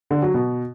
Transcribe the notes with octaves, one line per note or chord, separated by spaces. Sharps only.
D3
F#3
B2